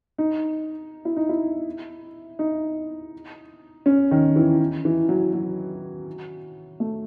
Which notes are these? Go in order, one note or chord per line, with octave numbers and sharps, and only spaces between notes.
D#4
E4
D#4
E4
D#4
C#4
D#3
E3
E3
F#3
F#3
A3